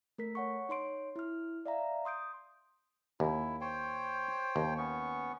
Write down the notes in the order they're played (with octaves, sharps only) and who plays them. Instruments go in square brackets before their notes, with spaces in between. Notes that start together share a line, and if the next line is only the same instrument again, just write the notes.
[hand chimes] A3 A#4 B6
C#5 F#5 C#6
D#4 C#5 C6 D7
E4 F6
D5 E5 F5 A#5
C6 D#6 G6 D7
[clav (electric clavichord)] D#2 [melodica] E4
[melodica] C5 C#5 G5
[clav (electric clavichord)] D#2
[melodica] B3 C#4 C#6